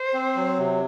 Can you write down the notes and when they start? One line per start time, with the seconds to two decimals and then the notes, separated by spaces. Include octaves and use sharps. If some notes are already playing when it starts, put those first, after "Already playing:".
Already playing: C5
0.14 C4
0.36 F#3
0.58 C3